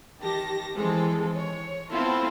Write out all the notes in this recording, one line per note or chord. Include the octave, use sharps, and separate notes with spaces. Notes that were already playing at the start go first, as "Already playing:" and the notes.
D#3 G4 A5 A#6
D#3 E3 G#3 C4 A4
C#5
B3 C4 E4 F4 A4